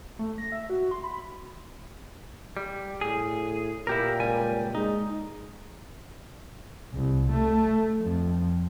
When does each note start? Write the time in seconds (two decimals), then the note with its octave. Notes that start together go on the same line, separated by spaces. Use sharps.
0.19 A3
0.38 A#6
0.52 E5
0.70 F#4
0.91 C6
1.03 B5
2.57 G3
3.01 A2 G#4
3.87 A#2 E4 G4 A#4
4.20 C#2 G3 G#5
4.75 G#3 D#4
6.93 C2
7.31 A3
8.01 F2